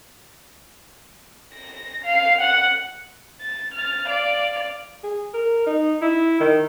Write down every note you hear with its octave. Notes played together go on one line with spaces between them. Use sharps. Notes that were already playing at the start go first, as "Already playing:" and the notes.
A#6
F5
F#5
A6
F6 A6
D5 F5
G#4
A#4
D#4
E4
D#3